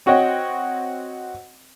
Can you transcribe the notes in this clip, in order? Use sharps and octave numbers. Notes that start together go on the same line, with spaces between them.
C4 F#4 C#5 D#5 G5